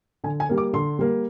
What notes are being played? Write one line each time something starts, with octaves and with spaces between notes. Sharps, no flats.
D3 G#5
G#5
G3 A#3
D6
D3 C6
G3 A#3